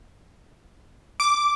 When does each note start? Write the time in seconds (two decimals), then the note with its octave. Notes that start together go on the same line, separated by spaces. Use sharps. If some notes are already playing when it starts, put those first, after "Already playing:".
1.20 D6